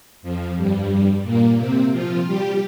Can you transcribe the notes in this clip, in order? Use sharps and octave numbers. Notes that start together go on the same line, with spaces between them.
F2 F3
G2 G3
A#2 A#3
C3 C4
F3 F4
G3 G4